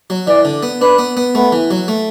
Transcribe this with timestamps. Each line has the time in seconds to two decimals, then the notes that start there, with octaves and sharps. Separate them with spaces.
0.10 F#3
0.27 E3 D5
0.45 D3
0.63 B3
0.81 D4 B4
0.99 B3
1.17 B3
1.35 A3 B3
1.52 E3
1.71 F#3
1.88 A3